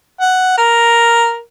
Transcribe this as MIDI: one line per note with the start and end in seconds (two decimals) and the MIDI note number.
0.21 0.56 78
0.58 1.39 70